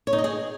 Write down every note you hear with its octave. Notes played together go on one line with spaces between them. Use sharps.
C#5
D#4
D#5
G#4